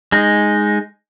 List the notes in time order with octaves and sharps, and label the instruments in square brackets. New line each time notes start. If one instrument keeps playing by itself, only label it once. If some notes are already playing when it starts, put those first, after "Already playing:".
[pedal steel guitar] G#3 D#4